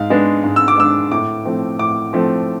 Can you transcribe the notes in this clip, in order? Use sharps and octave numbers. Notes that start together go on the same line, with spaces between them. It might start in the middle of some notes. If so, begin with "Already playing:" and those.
Already playing: G#2 F5
G#3 B3 D4
G#2
E6
D6
G#3 B3 D4 E6
A2 D6
F3 A3 C4
A2 D6
F3 A3 C4